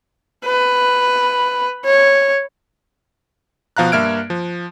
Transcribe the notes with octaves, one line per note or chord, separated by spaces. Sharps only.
B4
C#5
B2 F3 F5 A#5 F#6
G2 A#3 E5 F6 G#6 D7
F3